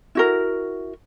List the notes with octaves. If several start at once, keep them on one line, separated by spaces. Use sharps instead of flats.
E4 F#4 A#4